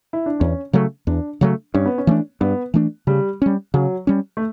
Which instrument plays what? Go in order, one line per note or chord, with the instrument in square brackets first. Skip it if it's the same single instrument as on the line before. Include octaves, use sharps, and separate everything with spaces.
[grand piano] E4
D4
[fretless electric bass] E2 [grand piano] C#4
[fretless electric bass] C#3 F#3 A3
[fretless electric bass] E2 [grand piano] D4
[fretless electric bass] C#3 F#3 A3
[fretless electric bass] G2 [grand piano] C#4
[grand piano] B3
C#4
[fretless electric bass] E3 A3 D4
[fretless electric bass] G2 [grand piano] B3
[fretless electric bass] E3 A3 D4
[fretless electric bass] C#3 [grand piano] G3
[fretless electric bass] G3 C#4
[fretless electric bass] C#3 [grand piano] F#3
[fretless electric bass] G3 C#4
[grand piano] A3